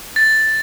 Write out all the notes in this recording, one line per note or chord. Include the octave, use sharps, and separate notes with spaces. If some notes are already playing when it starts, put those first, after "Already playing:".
A6